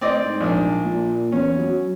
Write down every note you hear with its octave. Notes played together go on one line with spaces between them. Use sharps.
A2 C4 D5 D#5
G#2
A#1 D4
A#2
E2 C#4
F#3